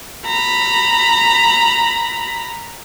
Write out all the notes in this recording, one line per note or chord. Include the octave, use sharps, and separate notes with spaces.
A#5 B5